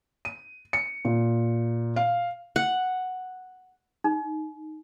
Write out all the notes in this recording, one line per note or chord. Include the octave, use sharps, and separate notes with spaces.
D#7
C#7
A#2
F5
F#5
D#4